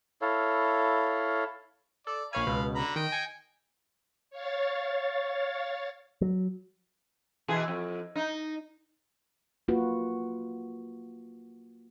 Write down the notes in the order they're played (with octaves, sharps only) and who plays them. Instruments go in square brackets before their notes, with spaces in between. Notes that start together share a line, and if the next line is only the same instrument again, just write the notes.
[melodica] E4 A4 C#5 F5
[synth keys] A4 [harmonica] D5
[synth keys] A#1 C#5 G#5 [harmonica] F5 B5
[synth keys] C#2 B2
[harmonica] D3 A#5 B5
[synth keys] D#3 [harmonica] D#5 G5
[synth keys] G#5 C#7
[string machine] C#5 F5 A6
[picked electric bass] F#3
[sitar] B2 E3 G#4
F2
D#4
[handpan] A#3 F4 F#4 B4